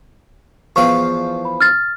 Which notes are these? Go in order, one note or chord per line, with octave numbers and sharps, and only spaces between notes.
E2 F3 F5 C#6
B5
F6 A6